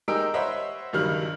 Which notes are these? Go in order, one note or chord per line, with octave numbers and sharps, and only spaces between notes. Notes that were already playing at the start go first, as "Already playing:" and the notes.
G#3 D#4 G4 A#4 E6 D7
C5 C#5 D#5 E5 F#5 B5
C#2 G2 D#3 F#3 G3 F6